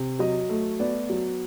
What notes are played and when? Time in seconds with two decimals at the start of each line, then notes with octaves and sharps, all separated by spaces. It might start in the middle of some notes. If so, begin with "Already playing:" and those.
Already playing: C3
0.19 F#3 D#5
0.50 A3
0.79 B3 D5
1.10 F#3